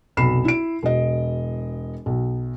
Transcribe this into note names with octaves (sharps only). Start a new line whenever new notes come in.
F1 B1 B5 C7 E7
E4 D7
E1 D#5
B1